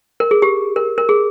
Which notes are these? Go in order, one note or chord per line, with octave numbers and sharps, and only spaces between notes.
A#4
G#4
G4
A#4
A#4
G#4